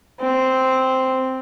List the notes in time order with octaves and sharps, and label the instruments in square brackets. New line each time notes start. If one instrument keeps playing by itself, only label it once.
[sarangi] C4